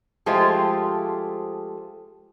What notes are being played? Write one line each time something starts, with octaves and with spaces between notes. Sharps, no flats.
F3 G#3 A3 F4 G4 C5